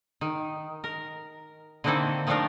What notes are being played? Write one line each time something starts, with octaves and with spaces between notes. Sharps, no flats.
D#3
A#4
D3 D#3 A#3 C4 E4 A4
D#3 F3 A3 D4 F4 A#4